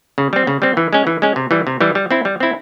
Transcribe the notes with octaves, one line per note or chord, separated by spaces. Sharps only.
C#3
G3 C4
C#3
G3 C4
E3
G#3 C#4
E3
G#3 C#4
C3
E3 G3
C3
E3 G3
G3
C4 E4
G3
C4 E4